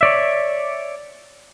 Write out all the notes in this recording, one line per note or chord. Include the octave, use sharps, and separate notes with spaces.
C#5 D5 E5